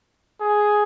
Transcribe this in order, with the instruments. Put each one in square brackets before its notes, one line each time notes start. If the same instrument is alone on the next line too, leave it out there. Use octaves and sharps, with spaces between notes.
[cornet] G#4